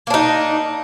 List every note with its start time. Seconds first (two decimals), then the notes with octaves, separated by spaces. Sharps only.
0.07 A#3
0.10 D4
0.14 D#4